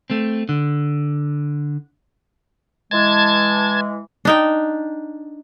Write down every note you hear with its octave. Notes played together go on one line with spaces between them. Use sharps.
A3 C4
D3
E3 G#3 A5 G#6
D4 D#4 G5